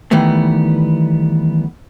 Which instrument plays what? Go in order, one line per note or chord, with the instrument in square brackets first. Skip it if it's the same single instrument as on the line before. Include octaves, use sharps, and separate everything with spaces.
[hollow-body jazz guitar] D#3 E3 G3 A3 B3